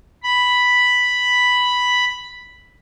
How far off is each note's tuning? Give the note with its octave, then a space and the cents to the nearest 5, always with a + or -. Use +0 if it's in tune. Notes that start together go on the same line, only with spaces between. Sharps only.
B5 +0